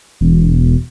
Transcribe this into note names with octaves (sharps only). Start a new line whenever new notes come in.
E1